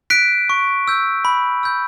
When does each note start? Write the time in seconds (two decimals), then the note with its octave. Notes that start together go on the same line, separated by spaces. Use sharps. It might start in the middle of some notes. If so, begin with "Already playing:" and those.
0.10 F#6 B6 D7
0.50 C#6
0.88 E6 G6
1.25 B5
1.63 E6 G6